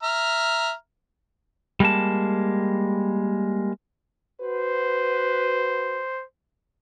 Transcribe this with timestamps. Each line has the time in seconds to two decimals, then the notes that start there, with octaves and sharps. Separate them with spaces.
0.03 E5 A#5 F6
1.80 G3 G#3 A#3 A5
4.42 F#4 B4 C5